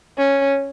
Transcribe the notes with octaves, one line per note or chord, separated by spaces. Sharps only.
C#4